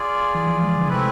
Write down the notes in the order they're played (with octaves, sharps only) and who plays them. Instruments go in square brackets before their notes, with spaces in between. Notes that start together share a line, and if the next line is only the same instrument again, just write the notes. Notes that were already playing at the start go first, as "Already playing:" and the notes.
Already playing: [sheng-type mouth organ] F4 G#4 D5
[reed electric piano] E3
F3
G#3
D3
[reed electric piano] C3 [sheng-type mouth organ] A3 C4 E4 B4